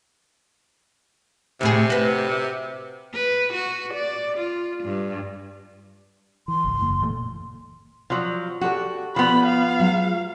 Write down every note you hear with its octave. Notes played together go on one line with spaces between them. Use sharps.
D2 A2 C3 G#4
F#4 B4
B4
F#4
D5
F4
G2
E3 C6
G#1 C#2
F#1 A#3
A#2 E3 A3
F3 F#3
F#4 G4 A4 D5
F3 B3 B5
F5
F#3 G#3 F4